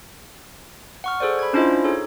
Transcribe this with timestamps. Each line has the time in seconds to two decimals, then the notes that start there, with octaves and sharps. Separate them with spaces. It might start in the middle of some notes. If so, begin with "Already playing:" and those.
1.04 F#5 C#6 F6
1.20 G#4 A4 C5 D5
1.39 B5 G#6
1.53 C#4 D4 E4 F4 C5 D#5
1.84 D#4 G#4 A4 C#5